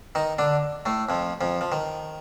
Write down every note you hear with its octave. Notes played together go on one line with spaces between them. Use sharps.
D#3 D#4
D3 D4
A2 A3
F2 F3
F2 F3
F3
D#3